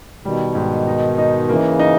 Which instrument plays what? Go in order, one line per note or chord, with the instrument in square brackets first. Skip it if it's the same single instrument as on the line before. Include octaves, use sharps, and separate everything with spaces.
[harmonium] B2 D#3 [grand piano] G3
[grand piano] G#2
D#4
D#4
[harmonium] C#3 E3 [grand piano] A#3
[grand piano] D#4